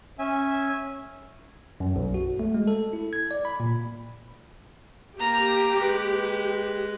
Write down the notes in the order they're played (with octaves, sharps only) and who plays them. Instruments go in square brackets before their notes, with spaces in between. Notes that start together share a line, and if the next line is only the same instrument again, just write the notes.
[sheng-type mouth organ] C#4 E5 G#5
[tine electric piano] F#2
B1
F#4
A3
G#3
A4
E4
G#6
D5
B5
A#2
[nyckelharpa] A#3 A#5 [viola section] G4
[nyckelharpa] G#3 B4